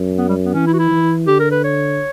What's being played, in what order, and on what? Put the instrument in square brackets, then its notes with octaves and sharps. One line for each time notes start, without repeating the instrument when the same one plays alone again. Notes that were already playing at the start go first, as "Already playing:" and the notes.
Already playing: [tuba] F#2
[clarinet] B3
G3
B3
[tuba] E3 [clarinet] C#4
[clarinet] E4
F#4
E4
[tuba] E3
[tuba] D3 [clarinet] G4
[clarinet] A#4
B4
C#5